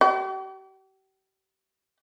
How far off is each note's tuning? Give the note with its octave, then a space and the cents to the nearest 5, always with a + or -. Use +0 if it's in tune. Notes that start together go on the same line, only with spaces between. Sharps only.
G4 -40